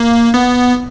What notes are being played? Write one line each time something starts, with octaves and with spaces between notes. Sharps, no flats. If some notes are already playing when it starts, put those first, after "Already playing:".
Already playing: A#3
B3